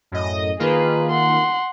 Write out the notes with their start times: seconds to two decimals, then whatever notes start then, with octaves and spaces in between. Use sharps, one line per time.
0.12 F#2 A2 D#5
0.59 D#3 A#3 F4 G#4 B4
1.12 F#5 C6